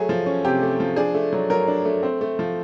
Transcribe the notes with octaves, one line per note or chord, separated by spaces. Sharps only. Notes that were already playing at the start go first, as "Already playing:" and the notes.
Already playing: F#3 A3 G#4
F3
C#4
C3 G4
A3
F3
D4 G#4
A3
F#3
F#3 A#4
D4
A3
C4
A3
F3